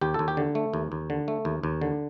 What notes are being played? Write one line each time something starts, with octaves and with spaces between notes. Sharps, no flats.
D#2 G4
D#2 A4
G4
D3
A3
D#2
D#2
D3
A3
D#2
D#2
D3